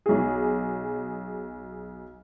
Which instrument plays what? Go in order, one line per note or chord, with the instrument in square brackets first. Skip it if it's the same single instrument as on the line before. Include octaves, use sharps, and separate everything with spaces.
[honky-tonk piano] B1 G#4